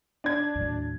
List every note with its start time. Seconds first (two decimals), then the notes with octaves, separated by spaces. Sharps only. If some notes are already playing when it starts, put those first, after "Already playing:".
0.24 D4 G#6
0.56 D#2 A2 F#3